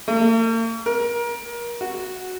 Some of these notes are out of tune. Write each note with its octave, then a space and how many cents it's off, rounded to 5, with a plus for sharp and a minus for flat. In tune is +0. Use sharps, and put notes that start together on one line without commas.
A#3 -45
A#4 +30
F#4 -5